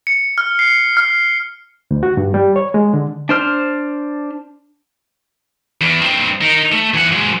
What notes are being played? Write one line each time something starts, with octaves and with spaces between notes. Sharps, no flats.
C#7
F6
C7
F6
D2
F#4
G2
G3
C#5
G#3
D3
D4 C5 F6
E2
G2 C4
D#4 A#4
A3
E3 F#5
F#3 G#3